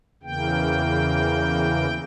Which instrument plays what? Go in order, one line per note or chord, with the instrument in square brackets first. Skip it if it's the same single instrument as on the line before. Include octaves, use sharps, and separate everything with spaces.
[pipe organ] E2 C#3 E3 A#3 G5